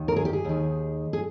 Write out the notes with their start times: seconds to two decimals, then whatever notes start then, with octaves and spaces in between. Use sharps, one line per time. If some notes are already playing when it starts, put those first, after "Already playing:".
Already playing: D#2 D#3
0.08 A#4
0.16 G#4
0.25 G4
0.33 G#4
0.45 D#2 D#3
1.13 G#4